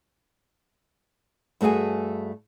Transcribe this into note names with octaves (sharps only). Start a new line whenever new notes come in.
G2 A3 F#4 G#4 G#5